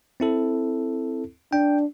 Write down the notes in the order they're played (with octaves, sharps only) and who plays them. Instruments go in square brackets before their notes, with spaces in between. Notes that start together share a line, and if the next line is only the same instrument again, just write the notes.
[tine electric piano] C4 E4 A4
[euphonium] D4 [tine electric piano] G5